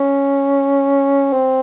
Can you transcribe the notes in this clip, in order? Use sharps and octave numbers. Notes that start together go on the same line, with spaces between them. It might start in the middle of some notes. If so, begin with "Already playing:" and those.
Already playing: C#4
C4